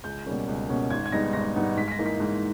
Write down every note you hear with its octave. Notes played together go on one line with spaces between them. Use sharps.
C#2 G6
B2 G3 A#3 C#4
C#2
B2 G3 A#3 C#4
G#1 G#6
G#6
G#2 G3 B3 D#4 A#6
G#1 A#6
G#2 G3 B3 D#4
G#2 B6
B6
A#6
E3 A#3 D#4
B6
G#2